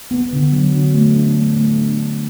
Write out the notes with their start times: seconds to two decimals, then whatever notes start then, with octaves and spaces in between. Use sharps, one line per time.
0.11 B3
0.33 D3
0.52 F#3
0.74 D3
0.94 A3
1.16 D4
1.35 A3
1.56 A3
1.78 D4
1.98 A3